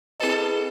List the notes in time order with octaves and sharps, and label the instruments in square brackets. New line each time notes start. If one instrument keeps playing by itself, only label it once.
[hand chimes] C4 E4 G#4 B4 D#5 [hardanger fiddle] A4